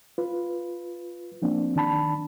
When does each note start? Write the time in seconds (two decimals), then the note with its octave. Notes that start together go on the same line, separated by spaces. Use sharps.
0.18 F4 B4
1.42 F3 A#3 C4 D4
1.75 D#3 D4 A5 B5